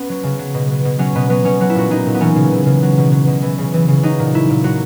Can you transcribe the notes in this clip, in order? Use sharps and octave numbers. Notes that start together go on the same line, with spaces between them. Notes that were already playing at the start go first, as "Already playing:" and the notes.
Already playing: B3 C#4
F#3
C#3
F#3
B2
F#3
B2
F#3 C#4
B2 B3
F#3 B3
B2 C#4
F#3 F#4
E4
A#2 F#4
F#3 D#4
A#2
B3
E3 C#4
C#3
E3
C#3
F#3
B2
F#3
B2
E3
C#3
E3
C#3
F#3 D#4
A#2
F#3 E4
A#2
F#3 F#4